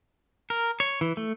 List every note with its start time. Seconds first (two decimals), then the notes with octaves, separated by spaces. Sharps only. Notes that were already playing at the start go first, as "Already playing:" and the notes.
0.50 A#4
0.80 C#5
1.01 E3
1.17 A3